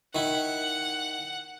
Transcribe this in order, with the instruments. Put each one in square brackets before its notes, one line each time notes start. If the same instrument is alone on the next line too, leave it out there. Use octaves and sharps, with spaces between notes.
[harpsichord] D#3 E4 [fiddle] F#5